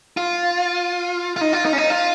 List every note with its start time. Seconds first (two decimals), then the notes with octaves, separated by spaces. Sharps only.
0.17 F4
1.36 F4
1.41 D#4
1.53 F4
1.65 D#4
1.73 C#4
1.78 D#4
1.90 F4